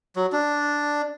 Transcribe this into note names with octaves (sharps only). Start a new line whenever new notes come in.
F#3
D4